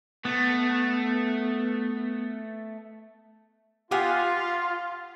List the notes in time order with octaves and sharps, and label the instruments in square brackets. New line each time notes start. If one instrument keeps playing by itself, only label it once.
[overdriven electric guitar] A3 [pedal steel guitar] B3
[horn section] F4 [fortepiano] G4 [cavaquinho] F#5 G#5 D#6